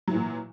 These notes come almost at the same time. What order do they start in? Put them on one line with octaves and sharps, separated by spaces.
F#3 E3 A#2